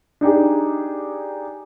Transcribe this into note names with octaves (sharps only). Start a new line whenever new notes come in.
D4 D#4 G4 G#4